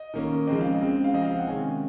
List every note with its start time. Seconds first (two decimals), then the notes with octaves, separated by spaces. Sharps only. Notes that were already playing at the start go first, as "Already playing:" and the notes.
Already playing: D#5
0.14 D#3 A#3 C#4
0.47 C#3 F3 G#3 C4 D#5
0.61 F5
0.73 D#5
0.80 C#3 G#3 C4
1.04 F5
1.14 F3 C4 D#5
1.25 F5
1.36 F#5
1.47 C3 D#3 G#3 C#4 G#5